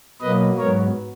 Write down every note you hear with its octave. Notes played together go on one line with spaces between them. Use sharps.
B2 F#3 A#3 B4 D#5
G#2 F#3 B3 A#4 C#5